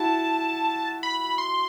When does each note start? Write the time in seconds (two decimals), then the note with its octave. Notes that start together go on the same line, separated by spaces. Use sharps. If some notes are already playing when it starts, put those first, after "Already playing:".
Already playing: E4 F#4 A5
1.03 B5
1.38 C6